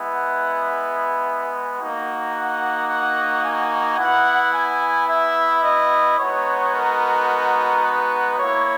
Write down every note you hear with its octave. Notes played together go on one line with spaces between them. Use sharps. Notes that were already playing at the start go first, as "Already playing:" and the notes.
Already playing: G#3 B3 E4
F#5
A#3 D#4 F#4
F#5
F#5
G#5
B3 E4 F#5
G#5
E5
D#5
G#3 B3 D#4 F#4 C#5
A#4
A#4
B4
A#3 E4 C#5